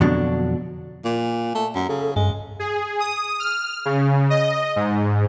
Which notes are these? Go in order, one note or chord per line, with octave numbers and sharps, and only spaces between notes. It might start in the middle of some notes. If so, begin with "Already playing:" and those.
F2 B2 D3 F#3 D4
A#2
A3
F#2
C#3 A4
G2 G#3
G#4
D#6
F6
C#3
D#5
G#2